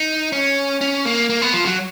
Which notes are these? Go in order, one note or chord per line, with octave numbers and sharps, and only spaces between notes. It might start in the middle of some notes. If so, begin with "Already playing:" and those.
Already playing: D#4
C#4
C#4
A#3
A#3
B3
F3
F#3